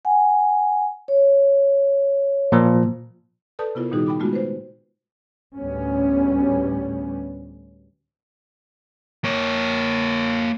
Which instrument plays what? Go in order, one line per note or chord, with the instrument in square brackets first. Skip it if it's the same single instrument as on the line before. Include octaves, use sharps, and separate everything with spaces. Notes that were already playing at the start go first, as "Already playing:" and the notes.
[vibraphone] F#5 G#5
C#5
[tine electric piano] A#2 F3
[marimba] A4 B4 D5 A5 D#6 G6
C3 B3 E4 F4 A#4
A#2 D#3 G3 D#4 F#4 G#4
G5 B5 D6
G#3 A3 B3 F4 F#4
B4 C5
[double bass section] D2 A2 G3 B3 C#4
[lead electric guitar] A#3 C#5